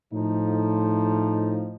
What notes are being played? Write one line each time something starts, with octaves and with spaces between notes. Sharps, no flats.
A2 F3 D#4